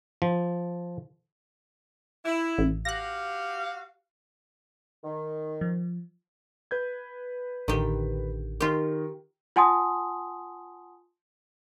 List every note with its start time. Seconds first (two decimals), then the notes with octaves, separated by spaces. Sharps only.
0.22 F3
2.24 E4
2.58 A1
2.85 F#4 G4 F5 F#6 A#6
5.04 D#3
5.61 F3
6.71 B4 G6 G#6
7.68 A1 D3 D#3 G4
8.60 D#3 F4 G4 A#4
9.56 F4 F#5 G#5 A5 C6 D#6